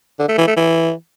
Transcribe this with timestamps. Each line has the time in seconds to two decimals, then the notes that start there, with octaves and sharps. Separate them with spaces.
0.19 D3
0.29 A3
0.38 E3
0.47 A3
0.57 E3